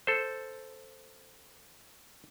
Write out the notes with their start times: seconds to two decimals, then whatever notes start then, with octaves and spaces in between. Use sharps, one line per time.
0.07 A4 C5